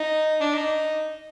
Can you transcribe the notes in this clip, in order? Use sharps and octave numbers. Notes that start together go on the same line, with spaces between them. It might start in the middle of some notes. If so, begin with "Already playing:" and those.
Already playing: D#4
D4
D#4